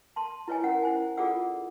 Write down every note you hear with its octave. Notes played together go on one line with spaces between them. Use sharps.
A5 C6
E4 B4 C#5 D#5 G#5
C#4 A#4 F#5
E4 C5 G#5
F4 G#4 A4 D5 F#5 E6